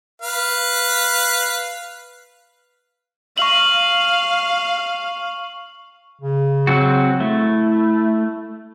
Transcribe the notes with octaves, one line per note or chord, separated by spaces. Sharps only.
B4 F5
F5 C#6 F#7
C#3
F#3 C4 F#4
A3 E4